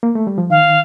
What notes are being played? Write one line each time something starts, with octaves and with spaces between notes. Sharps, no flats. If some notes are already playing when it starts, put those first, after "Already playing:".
A#3
A3
G3
F3
D#3 F5